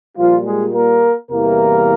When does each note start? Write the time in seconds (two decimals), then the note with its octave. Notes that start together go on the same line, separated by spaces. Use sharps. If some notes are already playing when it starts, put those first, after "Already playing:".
0.17 A#2 F3 G3 F4
0.45 G#3 G#4
0.74 A#3 A#4
1.31 E2 C3 E3 G3 A#3 A#4